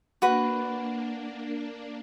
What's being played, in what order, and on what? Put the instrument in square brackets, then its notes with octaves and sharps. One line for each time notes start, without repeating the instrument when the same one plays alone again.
[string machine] A#3 D4 [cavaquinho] F#4 B4